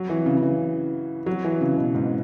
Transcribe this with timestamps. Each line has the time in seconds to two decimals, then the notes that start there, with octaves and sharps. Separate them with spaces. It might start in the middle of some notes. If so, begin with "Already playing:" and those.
Already playing: F#3
0.09 E3
0.26 C#3
0.37 C#3
0.42 E3
1.26 F#3
1.44 E3
1.61 C#3
1.77 B2
1.95 G#2